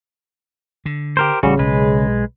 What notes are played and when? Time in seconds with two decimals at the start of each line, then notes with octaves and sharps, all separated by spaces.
0.86 D3
1.17 G4 A#4 C5
1.43 A1 C#3 G3 F#4
1.59 B1 G#3 B4